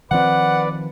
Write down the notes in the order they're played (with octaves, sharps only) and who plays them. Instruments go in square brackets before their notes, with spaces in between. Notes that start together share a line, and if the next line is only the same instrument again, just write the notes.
[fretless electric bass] D#3 F3 C4 [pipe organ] B4 D5 [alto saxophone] F#5